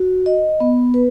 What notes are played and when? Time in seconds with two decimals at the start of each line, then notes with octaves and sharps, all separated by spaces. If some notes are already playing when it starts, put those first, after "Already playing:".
Already playing: F#4
0.26 D#5
0.60 B3
0.94 B4